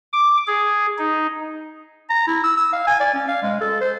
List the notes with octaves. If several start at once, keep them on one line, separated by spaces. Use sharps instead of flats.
D6
G#4
D#4
A#5
E4
E6
E6
F5
G#5
D5
C#4
F5
G#3
A4
C5